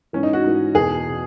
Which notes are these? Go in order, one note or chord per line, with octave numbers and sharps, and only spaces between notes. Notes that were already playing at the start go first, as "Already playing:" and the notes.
G#2 E3 C#4
D#4
F#4
G#2 E3
E2 B2 G#4
B2